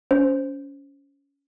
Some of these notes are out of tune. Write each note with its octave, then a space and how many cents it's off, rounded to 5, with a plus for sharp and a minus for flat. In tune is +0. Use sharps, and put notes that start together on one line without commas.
C#4 +20 C5 +0